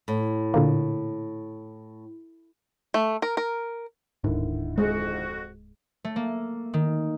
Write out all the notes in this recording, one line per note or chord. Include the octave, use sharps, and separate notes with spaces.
A2
A#2 D3 A#3
A3
A#4
A#4
D1 G#2 D3 D#3 E4
F2 G#3 F#4
A3
A#3
D#3